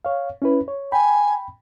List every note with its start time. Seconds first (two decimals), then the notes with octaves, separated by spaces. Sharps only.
0.05 C#5 F5
0.42 C#4 E4 B4
0.68 C#5
0.92 G5 G#5 B5